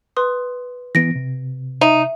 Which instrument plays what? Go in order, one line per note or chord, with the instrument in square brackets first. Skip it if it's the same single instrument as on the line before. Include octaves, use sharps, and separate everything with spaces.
[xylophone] B4 C6 D#6
[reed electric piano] E3 B3 [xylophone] A#6 D7
[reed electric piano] C3
[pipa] D#4 [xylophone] E5